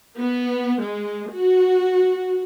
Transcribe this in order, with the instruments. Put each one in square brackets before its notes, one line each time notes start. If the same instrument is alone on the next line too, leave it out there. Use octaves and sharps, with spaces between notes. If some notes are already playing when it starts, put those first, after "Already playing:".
[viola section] B3
G#3
F#4